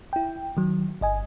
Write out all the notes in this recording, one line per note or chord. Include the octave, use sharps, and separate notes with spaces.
E4 G5
D#3 F#3
G1 D#5 G#5